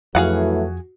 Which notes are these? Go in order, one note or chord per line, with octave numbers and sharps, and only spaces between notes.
F2 E3 F#3 A3 F#4 G#4 F5 F#5